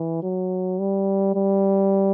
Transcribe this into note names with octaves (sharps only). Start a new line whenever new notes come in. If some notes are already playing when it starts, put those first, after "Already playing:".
Already playing: E3
F#3
G3
G3